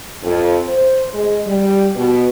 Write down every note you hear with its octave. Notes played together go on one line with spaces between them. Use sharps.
F2
C5
G#3
G3
B2